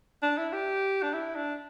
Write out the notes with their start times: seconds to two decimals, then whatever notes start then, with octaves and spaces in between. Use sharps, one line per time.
0.22 D4
0.38 E4
0.53 G4
1.03 D4
1.13 E4
1.35 D4